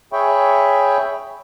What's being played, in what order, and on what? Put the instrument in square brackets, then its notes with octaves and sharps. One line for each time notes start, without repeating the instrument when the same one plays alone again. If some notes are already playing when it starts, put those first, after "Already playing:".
[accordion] G#4 C#5 E5 G5 B5 C#6